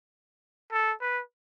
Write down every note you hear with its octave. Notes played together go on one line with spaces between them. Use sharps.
A4
B4